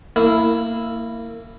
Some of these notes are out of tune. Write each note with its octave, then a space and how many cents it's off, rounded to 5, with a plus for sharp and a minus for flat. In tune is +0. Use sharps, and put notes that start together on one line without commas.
A#3 -25 E4 +0